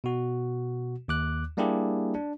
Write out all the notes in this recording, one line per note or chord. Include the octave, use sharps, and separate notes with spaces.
B2 F#4
D#2 D6 F#6
G3 A#3 D4 E4 G4 G#4
D4